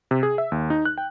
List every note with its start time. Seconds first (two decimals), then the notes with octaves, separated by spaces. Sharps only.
0.11 C3
0.23 G#4
0.38 E5
0.52 D#2
0.70 D#4
0.85 F#6
0.98 G5